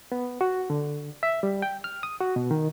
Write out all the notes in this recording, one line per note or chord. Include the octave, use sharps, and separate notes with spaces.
B3
F#4
D3
E5
G3
G5
F6
D#6
F#4
B2
D#3